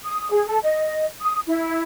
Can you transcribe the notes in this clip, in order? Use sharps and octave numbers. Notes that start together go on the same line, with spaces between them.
D#6
G#4
A4
D#5
D#6
E4